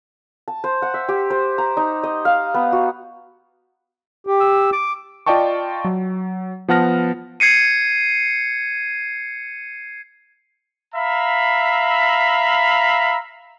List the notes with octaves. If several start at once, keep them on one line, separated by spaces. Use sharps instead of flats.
A5
C5
F#5
E5
G4
C5
A#5
D#4
D#5
F5
B3
F#4
G4
E6
D6
F4 D5 D#5 G5 A5 C#6
F#3
F3 B3 F#5 A5 F6 A#6
G#6 C7 C#7 D#7
E5 F5 A#5 B5